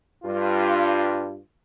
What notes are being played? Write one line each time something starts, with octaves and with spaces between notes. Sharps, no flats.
G2 F4